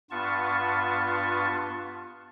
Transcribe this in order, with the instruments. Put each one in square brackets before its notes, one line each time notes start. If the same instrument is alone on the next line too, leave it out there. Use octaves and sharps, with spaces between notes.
[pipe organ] G2 B3 F4 A5 C#6